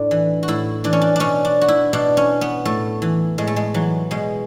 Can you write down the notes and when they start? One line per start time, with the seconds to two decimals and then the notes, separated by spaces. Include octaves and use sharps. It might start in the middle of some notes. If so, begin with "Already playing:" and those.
Already playing: A2 D4
0.11 E3
0.43 F#4
0.48 A2 E4
0.84 E3 D4
0.93 C#4
1.01 D4
1.16 B2 C#4 D4
1.45 D4
1.61 F#4
1.68 E4
1.93 B2 D4
2.17 C#4
2.41 B3
2.65 A2 A3
3.02 E3
3.38 A2 G#3
3.47 A3
3.56 G#3
3.74 E3 F#3
4.11 B2 G#3